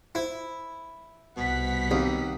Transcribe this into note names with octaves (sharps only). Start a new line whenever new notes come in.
E4 C5
C2 B2 F#5 B6
D#2 C4